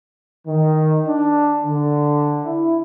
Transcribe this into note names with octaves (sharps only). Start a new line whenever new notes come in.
D#3
D4
D3
E4